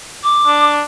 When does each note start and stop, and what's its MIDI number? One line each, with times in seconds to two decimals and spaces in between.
0.24 0.73 86
0.47 0.83 62